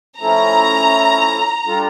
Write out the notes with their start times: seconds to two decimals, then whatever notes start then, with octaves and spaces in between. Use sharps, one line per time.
0.21 F3 A3 C#4 E4 A4 A#5
1.66 G3 D4 F4 A4